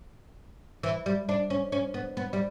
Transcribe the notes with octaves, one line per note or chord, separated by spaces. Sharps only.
E3
G3
D4
C#4
C#4
B3
B3
G3